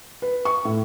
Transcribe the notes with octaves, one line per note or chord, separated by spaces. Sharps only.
B4
C#6
A2